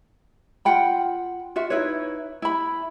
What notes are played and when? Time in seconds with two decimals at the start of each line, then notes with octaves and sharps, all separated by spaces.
0.65 F4 F#5 G5 B5
1.56 F4 F#4 E5
1.70 D#4 E4 B4 C#5
2.42 E4 B5